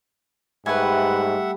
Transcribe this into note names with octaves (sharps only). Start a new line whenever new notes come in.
G#2 G3 A3 B4 E5 F#5 G#5